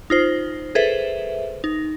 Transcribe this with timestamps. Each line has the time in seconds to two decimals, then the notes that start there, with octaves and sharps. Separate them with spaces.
0.10 D#4 F4 C5
0.75 G#4 A4 B4 C5 E5
1.64 D#4